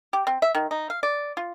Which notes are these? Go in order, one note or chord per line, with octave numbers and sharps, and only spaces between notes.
G4
C4
E5
D#3
D#4
F5
D5
F4